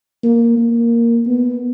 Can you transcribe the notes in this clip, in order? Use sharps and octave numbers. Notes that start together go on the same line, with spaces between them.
A#3
A#3
B3